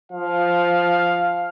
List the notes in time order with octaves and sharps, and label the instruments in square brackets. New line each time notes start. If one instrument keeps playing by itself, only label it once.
[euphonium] F3 [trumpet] F5